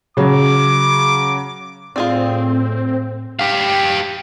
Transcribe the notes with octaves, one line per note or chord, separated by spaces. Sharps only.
C#3 F#3 D6
A2 C4 F4 G#4 D5
G4 F5